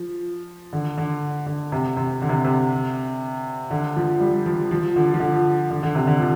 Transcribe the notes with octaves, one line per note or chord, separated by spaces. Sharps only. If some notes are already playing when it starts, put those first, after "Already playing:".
Already playing: F3
D3
D3
D3
C3
C3
D3
C3
C3
D3
F3
G3
F3
F3
D3
F3
D3
D3
D3
C3
D3
F3